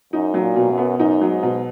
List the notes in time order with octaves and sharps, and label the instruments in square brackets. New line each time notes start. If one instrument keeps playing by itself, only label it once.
[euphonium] F#2 [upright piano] D#4
[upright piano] F#3
[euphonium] A#2
[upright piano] B2
[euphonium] F#2
[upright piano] B3
[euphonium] F#2 [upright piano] D#4
[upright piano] F#3
[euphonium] G#2
[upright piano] B2